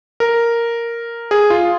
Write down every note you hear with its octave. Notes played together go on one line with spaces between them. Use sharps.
A#4
G#4
F4